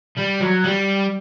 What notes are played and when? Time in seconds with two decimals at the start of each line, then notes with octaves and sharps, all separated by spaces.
0.17 G3
0.40 F#3
0.64 G3